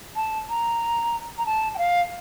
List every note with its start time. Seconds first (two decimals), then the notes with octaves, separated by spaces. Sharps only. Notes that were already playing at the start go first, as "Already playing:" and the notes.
0.16 A5
0.49 A#5
1.38 A#5
1.46 A5
1.75 G5
1.78 F5